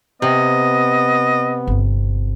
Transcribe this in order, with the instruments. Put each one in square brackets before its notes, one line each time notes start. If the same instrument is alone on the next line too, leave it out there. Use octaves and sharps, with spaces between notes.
[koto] C3 [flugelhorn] B3 [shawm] D#5
[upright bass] G1 C4